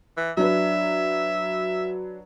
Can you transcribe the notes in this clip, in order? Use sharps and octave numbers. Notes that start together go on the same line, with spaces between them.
E3
F#3 D4 B4 E5